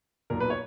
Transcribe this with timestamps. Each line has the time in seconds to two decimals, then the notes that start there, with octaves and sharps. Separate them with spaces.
0.30 B1 A#2 A#4
0.40 B4
0.50 C#5